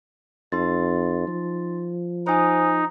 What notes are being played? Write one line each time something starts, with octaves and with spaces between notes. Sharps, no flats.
F2 D#4 C6 A6
F3
D#4 C5 G#5 D#6